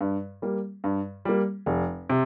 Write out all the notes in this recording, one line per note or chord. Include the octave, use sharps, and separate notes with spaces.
G2
G3 A#3
G2
G3 A#3
F1
C3